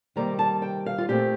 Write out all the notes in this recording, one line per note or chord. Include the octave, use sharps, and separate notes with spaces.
C3 D#3 G3 A#3 A#5
A5
G5
F5
F4
A#2 A3 C4 G4